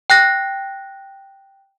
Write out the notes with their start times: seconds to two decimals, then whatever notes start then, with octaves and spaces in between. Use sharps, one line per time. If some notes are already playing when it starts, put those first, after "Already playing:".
0.10 G5 F#6 A#6